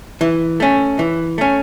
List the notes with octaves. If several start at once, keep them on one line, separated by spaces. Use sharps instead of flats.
E3
A3 C#4
E3
A3 C#4